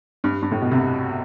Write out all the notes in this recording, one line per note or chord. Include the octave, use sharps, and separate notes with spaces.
G2
G2
A2
B2
C2 C3